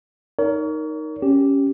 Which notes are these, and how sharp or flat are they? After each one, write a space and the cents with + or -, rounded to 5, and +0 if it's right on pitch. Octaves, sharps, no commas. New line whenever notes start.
D#4 +0 A#4 +0 C#5 +35
C#4 +0 G4 +0